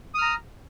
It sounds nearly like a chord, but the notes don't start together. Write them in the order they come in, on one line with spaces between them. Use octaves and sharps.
D#6 F6 A#5